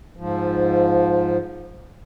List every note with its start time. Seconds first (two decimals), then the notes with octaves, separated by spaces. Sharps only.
0.17 G#2 F3